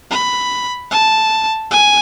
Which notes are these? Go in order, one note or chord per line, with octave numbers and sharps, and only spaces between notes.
B5
A5
G#5